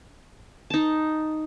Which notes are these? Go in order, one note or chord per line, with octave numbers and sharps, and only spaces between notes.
D#4 A5